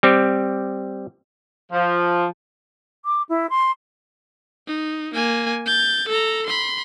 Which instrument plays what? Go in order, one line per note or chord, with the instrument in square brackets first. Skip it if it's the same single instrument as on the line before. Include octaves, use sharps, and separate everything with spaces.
[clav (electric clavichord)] G3 C4 G4
[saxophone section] F3
[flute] D6
E4
C6
[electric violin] D#4
A#3 G#5
G6 A6
A4 A#5
B5 C6